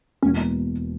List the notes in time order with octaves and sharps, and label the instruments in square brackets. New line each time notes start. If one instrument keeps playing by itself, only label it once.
[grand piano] E1 E2 B2 A#3 [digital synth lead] C#4